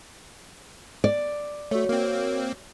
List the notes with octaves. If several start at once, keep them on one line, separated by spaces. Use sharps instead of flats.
D5
A3 F#4 C#5
A#3 C4